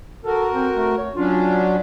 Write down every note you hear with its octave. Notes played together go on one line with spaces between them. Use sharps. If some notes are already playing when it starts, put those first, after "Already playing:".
F#4 A4 A#4
C4
A3
C#5
F#3 C#4 D4 F4